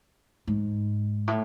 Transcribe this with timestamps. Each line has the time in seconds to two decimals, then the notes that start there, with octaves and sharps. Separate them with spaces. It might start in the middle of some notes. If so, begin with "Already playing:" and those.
0.47 G#2
1.28 A2